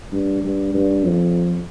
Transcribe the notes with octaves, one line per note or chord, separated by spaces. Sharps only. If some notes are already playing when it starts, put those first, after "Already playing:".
G2
G2
G2
F2